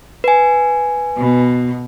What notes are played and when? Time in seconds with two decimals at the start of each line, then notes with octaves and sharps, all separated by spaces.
0.24 B4 G#5
1.16 B2